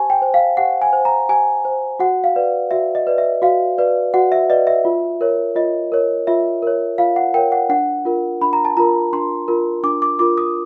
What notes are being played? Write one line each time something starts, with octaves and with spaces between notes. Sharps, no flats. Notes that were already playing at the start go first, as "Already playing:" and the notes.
Already playing: G4 C5 G#5 A5
G5
C5
F5
G4 F#5
G#5
C5
A#5
G4 G#5
C5
F#4 F#5
F5
B4 D5
F#4 E5
D#5
B4 D5
E5
F#4 F5
B4 D5
F#4 F#5
E5
B4 D5 D#5
E5
F4
A#4 C#5
F4 D#5
A#4 C#5
F4 E5
A#4 C#5
F4 F5
F#5
A#4 C#5 G5
F#5
D4 F#5
F4 A#4
D4 B5
A#5
A5
F4 A#4 A#5
D4 C6
F4 A#4
D4 D6
D6
F4 A#4 D6
D#6